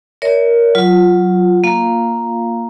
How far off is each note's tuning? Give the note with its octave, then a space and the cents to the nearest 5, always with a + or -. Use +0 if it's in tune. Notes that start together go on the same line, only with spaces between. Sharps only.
A#4 +5 C#5 +35 E5 -45
F#3 +0 F4 +0
A#3 +0 F4 +0 F5 +0